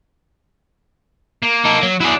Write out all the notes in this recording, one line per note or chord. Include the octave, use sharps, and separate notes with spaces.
A#3
D#4 A4
F#3
F#3 D4 E4 G#4